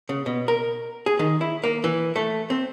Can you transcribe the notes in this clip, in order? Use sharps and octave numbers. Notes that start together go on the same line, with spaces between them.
C#3
B2
A#4
G#4
D#3
E4
A#3
E3
A3
C4